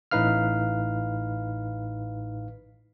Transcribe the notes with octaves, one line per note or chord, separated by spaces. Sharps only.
A1 A2 D#4 B4 F5 F6